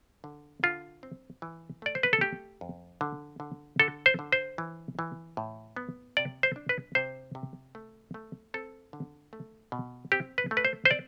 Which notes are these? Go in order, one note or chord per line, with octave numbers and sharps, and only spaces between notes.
D3
D3 F4
C4
E3
A3 D5
C5
B4
A4
A3 G4
F2
D3
D3
D3 A4
C5
D3
C5
E3
E3
A2
B3
C3 D5
C5
D4
B4
C3 C5
C3
A3
A3
C4 A4
D3
A3
B2
C4 G4
B4
A3
B4
C5
C5
C4 D5